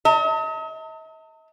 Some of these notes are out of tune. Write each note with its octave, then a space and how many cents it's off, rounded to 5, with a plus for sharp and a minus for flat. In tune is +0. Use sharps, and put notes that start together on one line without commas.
D#5 +45 A5 +45